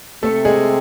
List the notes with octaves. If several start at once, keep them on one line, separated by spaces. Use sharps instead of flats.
C3 A3 A4
G#3 G#4